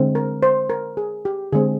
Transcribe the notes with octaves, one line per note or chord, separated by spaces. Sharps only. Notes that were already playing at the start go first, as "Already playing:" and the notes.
Already playing: D3 G#3 C4
A#4
C5
A#4
G#4
G4
D3 G#3 C4 G#4